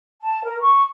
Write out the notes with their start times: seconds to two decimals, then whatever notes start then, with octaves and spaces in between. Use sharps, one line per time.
0.22 A5
0.44 A#4
0.61 C#6